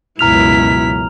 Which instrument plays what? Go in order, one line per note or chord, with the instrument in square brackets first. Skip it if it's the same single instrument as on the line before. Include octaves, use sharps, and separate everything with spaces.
[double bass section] C#2 F#2 B2 [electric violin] E4 B6 [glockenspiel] A#5 F6 F7